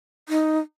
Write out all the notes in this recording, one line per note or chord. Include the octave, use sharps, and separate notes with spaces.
D#4